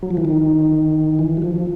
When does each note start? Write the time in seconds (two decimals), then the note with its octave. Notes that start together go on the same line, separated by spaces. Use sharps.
0.02 F#3
0.10 F3
0.17 E3
0.25 D#3
1.19 E3
1.37 F#3
1.42 F3